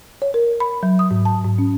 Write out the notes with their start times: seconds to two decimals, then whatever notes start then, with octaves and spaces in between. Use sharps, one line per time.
0.22 C#5
0.34 A#4
0.60 B5
0.83 F#3
0.99 D#6
1.11 G#2
1.25 A5
1.44 G#2
1.58 C#4